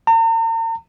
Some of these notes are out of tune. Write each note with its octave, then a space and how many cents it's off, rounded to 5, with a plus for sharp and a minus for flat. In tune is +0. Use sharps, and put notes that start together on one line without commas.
A#5 -45